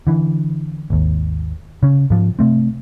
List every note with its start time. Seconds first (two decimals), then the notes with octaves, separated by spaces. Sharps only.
0.07 D3 E3
0.90 G#1 D#2
1.83 C#3 C#4
2.10 G#2 F3
2.39 C3 A3 C4